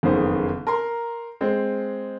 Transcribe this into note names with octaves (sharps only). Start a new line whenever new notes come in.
F#1 F2 G#2 D#3 B3 C5
A#4 A#5 C6
G#3 C4